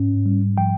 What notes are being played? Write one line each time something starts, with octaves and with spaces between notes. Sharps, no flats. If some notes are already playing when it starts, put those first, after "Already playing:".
Already playing: G#2 C#4
G3
F3 G5